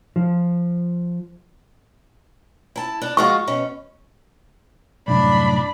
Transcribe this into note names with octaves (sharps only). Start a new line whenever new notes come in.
F3
E4 A5
D4
G#3 F4 F#4 C#6
B2 C#4
C2 F#2 A2 D4 B5